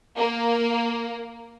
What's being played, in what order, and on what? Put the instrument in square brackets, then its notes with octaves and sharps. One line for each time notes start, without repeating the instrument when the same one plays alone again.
[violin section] A#3